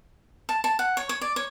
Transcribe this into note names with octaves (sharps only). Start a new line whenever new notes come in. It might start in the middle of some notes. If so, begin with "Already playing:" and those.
A5
A5
F#5
C#5
C#5
D5
C#5